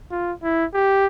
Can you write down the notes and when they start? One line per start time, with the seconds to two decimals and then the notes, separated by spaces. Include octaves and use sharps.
0.11 F4
0.43 E4
0.74 G4